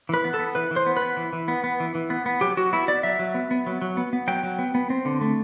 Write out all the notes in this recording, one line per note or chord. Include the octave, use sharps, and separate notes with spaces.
E3 B4
B3
A4
B3
E3 B4
E3
C5
B3
B4
B3
E3
E3
B3
B3
E3
E3
B3
B3
F#3 G4
F#3 F#4
B3 E4
B3 D5
F#3 E5
F#3
B3
B3
F#3
F#3
B3
B3
F#3 G5
F#3
B3
B3
C4
D3
A3